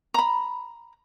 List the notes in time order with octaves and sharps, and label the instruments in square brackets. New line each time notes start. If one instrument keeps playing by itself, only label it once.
[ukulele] A#5 B5